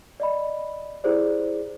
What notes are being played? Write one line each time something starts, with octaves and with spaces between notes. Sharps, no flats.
D5 D#5 B5
E4 G4 G#4 C5 D5